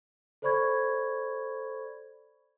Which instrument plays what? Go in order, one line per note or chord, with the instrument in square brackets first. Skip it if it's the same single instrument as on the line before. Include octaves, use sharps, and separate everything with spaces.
[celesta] A4 C5 D5 B5 C#6 G#6